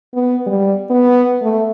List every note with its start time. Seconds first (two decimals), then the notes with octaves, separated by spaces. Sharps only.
0.14 B3
0.47 G3
0.90 B3
1.42 A3